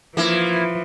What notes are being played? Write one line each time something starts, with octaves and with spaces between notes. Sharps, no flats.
E3 F3 A#3 E4